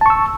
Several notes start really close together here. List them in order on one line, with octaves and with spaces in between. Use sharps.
A5 C#6 E6